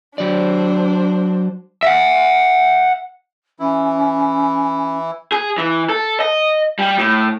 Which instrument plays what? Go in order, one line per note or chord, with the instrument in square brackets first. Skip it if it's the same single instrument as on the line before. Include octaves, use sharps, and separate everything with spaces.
[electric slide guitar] F#3 D5 [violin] D4 C5
[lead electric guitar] E5 F#5
[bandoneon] E3 E4 [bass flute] C#4
[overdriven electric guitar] G#4
E3
A4
D#5
G3
A2